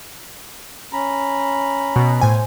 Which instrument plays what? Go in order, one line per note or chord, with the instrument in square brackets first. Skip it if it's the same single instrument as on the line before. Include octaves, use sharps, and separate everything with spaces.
[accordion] C#4 A#5 B5
[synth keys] B2
[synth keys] A2 G#5 [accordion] C5